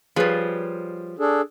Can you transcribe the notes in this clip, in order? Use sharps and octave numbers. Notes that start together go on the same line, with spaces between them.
F3 G3 G#4 B4 C#5
D4 G#4 A4